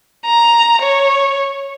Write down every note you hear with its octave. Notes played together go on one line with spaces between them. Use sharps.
A#5
C#5